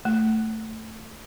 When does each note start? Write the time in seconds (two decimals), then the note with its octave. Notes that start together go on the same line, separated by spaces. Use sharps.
0.05 A3